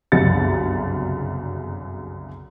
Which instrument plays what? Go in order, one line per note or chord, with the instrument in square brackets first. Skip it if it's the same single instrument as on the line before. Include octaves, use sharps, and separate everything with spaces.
[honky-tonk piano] G1 C2 F#2 C#3 A6 C#7